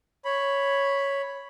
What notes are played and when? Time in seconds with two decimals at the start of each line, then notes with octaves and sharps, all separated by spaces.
0.25 C#5 B5